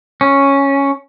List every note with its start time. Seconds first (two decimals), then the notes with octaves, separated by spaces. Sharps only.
0.21 C#4